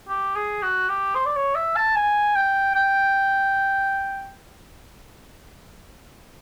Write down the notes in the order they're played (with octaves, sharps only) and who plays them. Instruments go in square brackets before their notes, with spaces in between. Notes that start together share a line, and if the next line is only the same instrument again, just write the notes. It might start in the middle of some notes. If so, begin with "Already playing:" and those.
[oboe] G4
G#4
F#4
G4
C5
D5
C#5
E5
A5
G#5
G5
G5